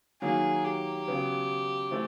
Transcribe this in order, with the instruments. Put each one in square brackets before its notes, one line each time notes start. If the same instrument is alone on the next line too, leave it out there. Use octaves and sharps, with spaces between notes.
[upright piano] D#3 F#3 A#3 [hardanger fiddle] G#4
[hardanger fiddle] G4
[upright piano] C#3 F#3 B3
E3 A3 C4